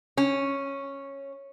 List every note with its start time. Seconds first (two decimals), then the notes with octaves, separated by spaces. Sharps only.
0.17 C#4